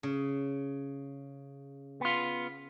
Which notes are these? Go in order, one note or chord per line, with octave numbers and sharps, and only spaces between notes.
C#3
B3 F4